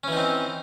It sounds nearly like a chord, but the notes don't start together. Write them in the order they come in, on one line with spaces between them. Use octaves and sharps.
C#4 E3 D#4 C4